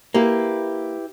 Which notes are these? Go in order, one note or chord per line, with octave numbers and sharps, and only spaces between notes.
A#3 E4 G4 B4